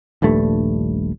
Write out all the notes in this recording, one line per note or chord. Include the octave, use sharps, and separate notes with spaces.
D#1 A#1 G2 A3